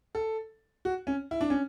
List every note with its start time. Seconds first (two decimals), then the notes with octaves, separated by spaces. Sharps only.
0.15 A4
0.85 F#4
1.07 C#4
1.31 E4
1.41 D4
1.50 C#4